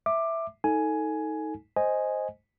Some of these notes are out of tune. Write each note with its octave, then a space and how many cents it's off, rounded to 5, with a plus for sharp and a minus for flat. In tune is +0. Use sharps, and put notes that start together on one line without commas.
E5 +0 D6 +15
D#4 +25 A4 +10 G#5 +10
C5 +0 D#5 +0 G#5 +0